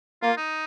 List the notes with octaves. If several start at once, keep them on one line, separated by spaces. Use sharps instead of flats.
A#3 F4
D#4